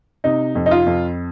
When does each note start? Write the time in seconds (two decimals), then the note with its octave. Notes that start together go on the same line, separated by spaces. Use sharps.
0.24 C3 D#4
0.55 F2
0.66 D#4
0.71 F4
0.86 F2